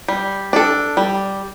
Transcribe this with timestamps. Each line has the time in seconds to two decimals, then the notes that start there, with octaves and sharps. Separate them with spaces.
0.08 G3
0.53 D4 A4
0.97 G3